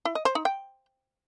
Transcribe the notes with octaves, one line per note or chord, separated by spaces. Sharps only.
E4
D#5
C5
D#4
G5